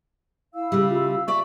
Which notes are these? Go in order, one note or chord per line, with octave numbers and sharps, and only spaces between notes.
E4 F5 E6
C#3 G3
F4
D5 E5 C#6